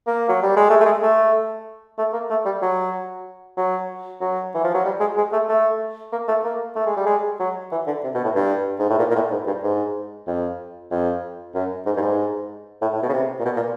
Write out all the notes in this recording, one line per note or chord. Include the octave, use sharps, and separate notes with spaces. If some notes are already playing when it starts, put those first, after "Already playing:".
A#3
F#3
G3
G#3
A3
A3
G#3
A3
A3
A#3
A3
G3
F#3
F#3
F#3
E3
F3
F#3
G3
G#3
G#3
A3
A3
A#3
A3
A#3
A3
G#3
G3
G#3
F#3
E3
D3
C3
B2
A2
G2
G#2
A2
A#2
A#2
A2
G#2
G2
G#2
F2
F2
F#2
G#2
G2
G#2
A2
A2
B2
C#3
C3
A#2
B2
A#2